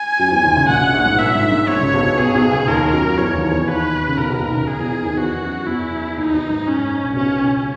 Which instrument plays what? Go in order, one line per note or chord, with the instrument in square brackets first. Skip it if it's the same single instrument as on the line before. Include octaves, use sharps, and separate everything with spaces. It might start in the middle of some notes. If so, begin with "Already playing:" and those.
Already playing: [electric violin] G#5
[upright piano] F#2 F#3
E2 E3
D#2 D#3
C#2 C#3
[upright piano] A#1 A#2 [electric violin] F#5
[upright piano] F#2
A#1 A#2
G#2
[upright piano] A#1 A#2 [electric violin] E5
[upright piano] G#2
G#2
[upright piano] A#1 A#2 [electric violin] C#5
[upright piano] C#2 C#3
B1 B2
B1 B2
[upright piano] B1 B2 [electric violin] G#4
[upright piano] B1 B2
C#2 C#3
[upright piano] D#2 D#3 [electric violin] A#4
[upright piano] F#2 F#3
F#3
[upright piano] E2 E3 [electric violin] C#5
[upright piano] D#2 D#3
E2 E3
[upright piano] D#2 D#3 [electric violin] B4
[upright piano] C#3
[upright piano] B1 B2 [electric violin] A#4
[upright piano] B1 B2
D#2 D#3
C#2 C#3
[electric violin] G#4
[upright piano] E2 E3
E2 E3
D#2 D#3
[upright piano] E2 E3 [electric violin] F#4
[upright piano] F#2 F#3
[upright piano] E2 E3 [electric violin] E4
[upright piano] E3
[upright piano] D#2 D#3 [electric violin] D#4
[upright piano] B1 B2
G#2
[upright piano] F#2 [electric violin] C#4
[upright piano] G#2
A#1 A#2
C#3
[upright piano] B1 B2 [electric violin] C#4
[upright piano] C#2 C#3